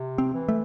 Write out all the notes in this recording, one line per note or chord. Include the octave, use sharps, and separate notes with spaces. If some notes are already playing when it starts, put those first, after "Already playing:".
Already playing: C3
C4
E3
A3